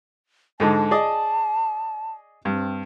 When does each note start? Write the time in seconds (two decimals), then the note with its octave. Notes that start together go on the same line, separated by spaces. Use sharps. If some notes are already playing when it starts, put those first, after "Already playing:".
0.60 G#2 D3 G#3 A5
0.91 G#4 D5 D#5
2.45 G2 C4